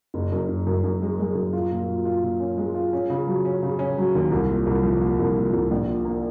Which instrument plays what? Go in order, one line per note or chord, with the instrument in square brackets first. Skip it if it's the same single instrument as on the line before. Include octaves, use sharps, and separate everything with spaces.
[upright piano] F#1
F#2
F#1
F#2
F#2
G#3
G#3
F#2
F4
A#2
A#2
F4
A#2
C#4
G#3
F4
C#4
C#3
F#3
C#4
C#3
C#4
F#3
D#2
C2
A#2
C2
F3
A#2
C2
A#2
C2
A#1
A#2
A#3